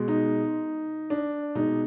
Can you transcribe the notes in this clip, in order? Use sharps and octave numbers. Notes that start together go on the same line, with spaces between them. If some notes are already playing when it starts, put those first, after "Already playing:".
Already playing: B2 G#3
D#4
D4
B2 G#3 D#4